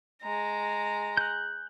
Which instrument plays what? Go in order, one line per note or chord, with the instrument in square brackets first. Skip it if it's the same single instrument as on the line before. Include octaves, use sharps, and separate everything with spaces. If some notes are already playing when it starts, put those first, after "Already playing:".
[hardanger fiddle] G#3 A#5
[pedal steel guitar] F#6 G6